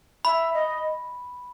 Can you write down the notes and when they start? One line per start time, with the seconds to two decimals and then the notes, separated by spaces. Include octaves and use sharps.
0.25 E5 B5
0.53 D#5